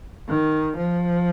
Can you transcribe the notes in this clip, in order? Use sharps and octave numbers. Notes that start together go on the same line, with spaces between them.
D#3
F3